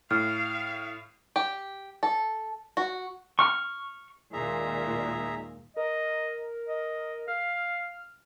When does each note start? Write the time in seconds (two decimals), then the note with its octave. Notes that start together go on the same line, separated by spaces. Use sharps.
0.11 A2 F5 F6
1.36 G4
2.03 A4
2.77 F#4
3.39 C#6 F6
4.33 D#2 A#2 D#3 G#3 G#4 E5 A#5
5.77 A#4 D#5
6.68 D#5
7.28 F5 F6